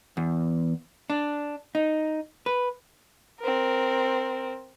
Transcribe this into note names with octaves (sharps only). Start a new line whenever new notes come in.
E2
D4
D#4
B4
C4 A#4